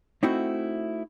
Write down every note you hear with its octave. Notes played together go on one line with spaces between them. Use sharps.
A3 C4 D#4 E4 F#4